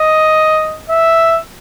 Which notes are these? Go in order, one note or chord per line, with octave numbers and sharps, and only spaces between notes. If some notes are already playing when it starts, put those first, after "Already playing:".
Already playing: D#5
E5